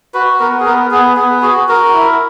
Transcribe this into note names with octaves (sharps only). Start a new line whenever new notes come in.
F#4 B4
B3 A#4
G#4
B3 A#4
B3 G#4
B3 G#4
F#4 G#4
F#4 A#4
E4